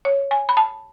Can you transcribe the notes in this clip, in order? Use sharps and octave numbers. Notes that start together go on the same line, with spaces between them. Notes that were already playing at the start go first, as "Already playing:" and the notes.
C#5
G#5
B5
A5